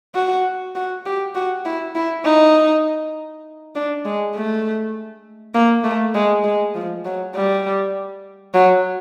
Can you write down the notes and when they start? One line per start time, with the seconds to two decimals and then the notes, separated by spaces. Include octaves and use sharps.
0.15 F#4
0.75 F#4
1.05 G4
1.35 F#4
1.65 E4
1.95 E4
2.24 D#4
3.75 D4
4.05 G#3
4.35 A3
5.54 A#3
5.84 A3
6.15 G#3
6.44 G#3
6.75 F3
7.05 F#3
7.35 G3
8.54 F#3